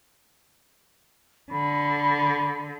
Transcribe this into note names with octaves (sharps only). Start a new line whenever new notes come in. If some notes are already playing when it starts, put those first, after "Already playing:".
D3 B5